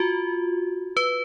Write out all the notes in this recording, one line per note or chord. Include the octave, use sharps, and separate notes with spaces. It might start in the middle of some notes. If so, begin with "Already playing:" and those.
Already playing: F4 F#4
B4